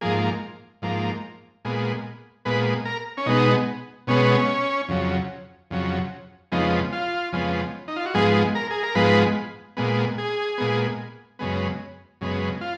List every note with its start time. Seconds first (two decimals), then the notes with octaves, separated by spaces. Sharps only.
0.01 G#2 F3 A#3 G#4
0.82 G#2 F3 A#3
1.65 A#2 G#3 B3
2.45 A#2 G#3 B3 B4
2.85 A#4
3.17 C#4
3.26 B2 G#3 B3 D#4
4.07 B2 G#3 B3 C#4
4.89 F2 C#3 F#3
5.71 F2 C#3 F#3
6.52 F2 C#3 F3 G#3 B3 D#4
6.92 F4
7.33 F2 C#3 F3 G#3 B3
7.88 D#4
7.96 F4
8.06 F#4
8.14 G#2 F3 G#3 B3 G#4
8.55 A#4
8.70 G#4
8.83 A#4
8.95 G#2 F3 G#3 B3 B4
9.77 A#2 G#3 B3
10.18 G#4
10.58 A#2 G#3 B3
11.39 F#2 C#3 G#3 B3
12.21 F#2 C#3 G#3 B3
12.61 F4